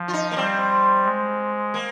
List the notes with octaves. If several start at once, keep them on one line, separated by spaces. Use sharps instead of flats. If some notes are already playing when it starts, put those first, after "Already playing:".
Already playing: F3
F4
D#4
A#3
G3 C4
G#3
A#3